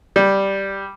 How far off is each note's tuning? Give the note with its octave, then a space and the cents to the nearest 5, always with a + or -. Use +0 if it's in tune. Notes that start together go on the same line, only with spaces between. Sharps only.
G3 +0